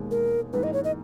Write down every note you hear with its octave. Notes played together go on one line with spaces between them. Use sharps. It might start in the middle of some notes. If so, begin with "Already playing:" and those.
Already playing: E1 D#2 D#3 G#3
A#4
G#1 G#2 E3 A#3 B4
D#5
C#5
D#5